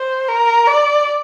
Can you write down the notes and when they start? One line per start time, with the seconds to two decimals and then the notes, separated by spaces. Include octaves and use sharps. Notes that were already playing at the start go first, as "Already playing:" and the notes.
Already playing: C5
0.29 A#4
0.67 D5